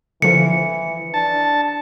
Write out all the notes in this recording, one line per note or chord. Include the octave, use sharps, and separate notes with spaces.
D3 E3 F3 C#7
D4 A5